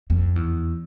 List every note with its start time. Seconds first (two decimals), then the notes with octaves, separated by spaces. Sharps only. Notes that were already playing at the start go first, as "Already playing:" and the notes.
0.10 F2
0.36 E2